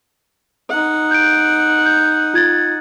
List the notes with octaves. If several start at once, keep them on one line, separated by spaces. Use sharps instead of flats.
D#4 F#5
G6 D7
G6
F4 G#6 A6